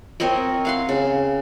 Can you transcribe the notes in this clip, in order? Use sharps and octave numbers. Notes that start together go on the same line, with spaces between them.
C4 A#4 C#5 D#5
F5 F#5 C6
C#3